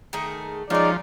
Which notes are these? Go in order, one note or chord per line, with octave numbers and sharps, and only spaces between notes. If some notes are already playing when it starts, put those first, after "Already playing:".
D#3 A3 G#4
F3 G#3 C#4 D#4 A#4 D5